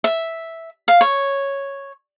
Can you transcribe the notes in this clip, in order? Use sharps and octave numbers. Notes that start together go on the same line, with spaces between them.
E5
F5
C#5